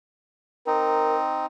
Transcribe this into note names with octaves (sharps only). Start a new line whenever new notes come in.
C4 D#4 A#4